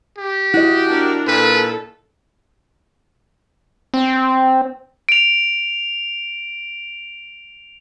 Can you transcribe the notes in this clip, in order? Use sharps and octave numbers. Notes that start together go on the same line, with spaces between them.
G4
E4 F#4 D#5
D4 A#4
A#2 A4 B4
C4
D7 F7